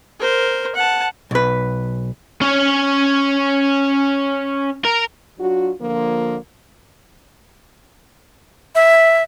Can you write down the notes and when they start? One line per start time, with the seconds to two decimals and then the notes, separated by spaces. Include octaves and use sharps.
0.19 A#4 C5
0.75 F#5 A5
1.31 B1 B4
2.42 C#4 C#5
4.85 A#4
5.40 F#3 D4 F4 F#4
5.81 D3 F3 A#3
8.75 E5